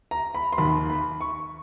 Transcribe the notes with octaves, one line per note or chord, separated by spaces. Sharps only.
A#5
B5
C6
D#2 D#3 B5
B5
C#6